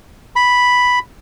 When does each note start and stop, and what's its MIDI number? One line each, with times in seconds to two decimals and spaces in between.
0.36 0.99 83